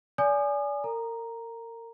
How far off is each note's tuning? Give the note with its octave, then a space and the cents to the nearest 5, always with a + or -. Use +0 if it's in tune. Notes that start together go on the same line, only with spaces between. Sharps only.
D5 -30 G#5 +0 D#6 -40
A#4 -30 A#5 +0